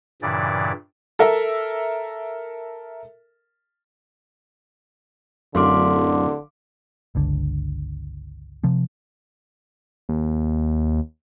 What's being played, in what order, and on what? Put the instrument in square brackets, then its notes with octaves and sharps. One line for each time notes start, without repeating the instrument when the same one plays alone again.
[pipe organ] G2 A#2 C#3 E3 D5
[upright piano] A4 A#4 E5
[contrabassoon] D1 [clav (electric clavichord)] F#2 [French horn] D3 [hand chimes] F5 C6 D6
[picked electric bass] G1 C#2 D3
C3 F3 C4
[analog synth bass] D#2